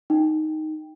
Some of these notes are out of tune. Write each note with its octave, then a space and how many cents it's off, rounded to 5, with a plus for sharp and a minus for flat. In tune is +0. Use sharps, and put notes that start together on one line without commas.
D#4 +0 G5 +10